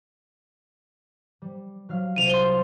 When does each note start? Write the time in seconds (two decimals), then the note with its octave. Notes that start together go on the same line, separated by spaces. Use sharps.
1.42 G3
1.89 F#3 F5 F6
2.16 C2 D#7 F7
2.29 C6 G7